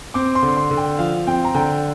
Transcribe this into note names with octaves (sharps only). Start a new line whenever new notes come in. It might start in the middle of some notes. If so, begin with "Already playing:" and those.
C4 D6
C6
D3
C6
D3
G5
F3 F5
C4 G5
A#5
D3 G5